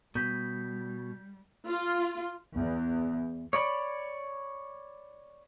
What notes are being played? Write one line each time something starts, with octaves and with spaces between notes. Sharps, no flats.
B2 G3 G6 B6
F4
E2
C#5 D5 B5